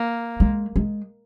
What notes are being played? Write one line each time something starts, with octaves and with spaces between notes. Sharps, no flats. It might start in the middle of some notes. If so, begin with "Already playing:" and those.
Already playing: A#3
G#3
G#3